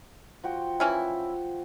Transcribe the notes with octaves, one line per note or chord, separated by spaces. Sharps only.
F3 F#4 G5
E3 C#4 E4